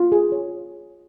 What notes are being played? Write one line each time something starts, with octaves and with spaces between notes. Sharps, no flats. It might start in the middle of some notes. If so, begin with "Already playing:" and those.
Already playing: F4
G#4
C#5